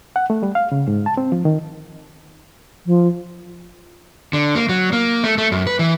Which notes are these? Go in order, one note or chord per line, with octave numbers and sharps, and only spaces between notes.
F#5
A3
G3
F5
C#3
G#2
A5
C4
F3
D#3
F3
D3
A#3
F#3
A#3
A3
A3
F#2
B4
E3